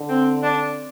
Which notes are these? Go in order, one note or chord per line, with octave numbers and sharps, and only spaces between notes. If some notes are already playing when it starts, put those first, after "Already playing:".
Already playing: D3
C4
D4